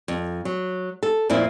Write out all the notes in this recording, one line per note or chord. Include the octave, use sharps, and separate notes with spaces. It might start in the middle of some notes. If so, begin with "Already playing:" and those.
F2
F#3
A4
F2 A#2 C4 E4